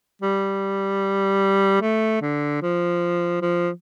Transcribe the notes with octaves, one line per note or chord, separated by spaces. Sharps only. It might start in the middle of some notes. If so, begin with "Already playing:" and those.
G3
A3
D3
F3
F3